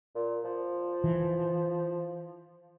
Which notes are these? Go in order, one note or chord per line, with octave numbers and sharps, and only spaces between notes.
A#2
F3
E3